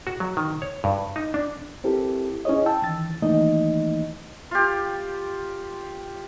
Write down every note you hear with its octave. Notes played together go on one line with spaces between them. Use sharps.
F#4
F#3
D#3
C#5
G2
D#4
D4
C4 E4 G4 A4 A#4
C#4 E4 G#4 C#5 D#5
G5 A5 E6
D#3 E3 A6
D#3 E3 A3 A#3 D#4 D#5
F4 G4